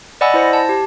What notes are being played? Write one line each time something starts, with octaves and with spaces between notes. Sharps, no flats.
D5 D#5 F#5 G#5 B5 E6
E4 C5 A#6
A5
G4